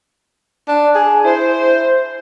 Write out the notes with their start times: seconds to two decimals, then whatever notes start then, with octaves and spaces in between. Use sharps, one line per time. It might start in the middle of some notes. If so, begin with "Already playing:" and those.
0.68 D4
0.95 G#4
1.25 E4 C5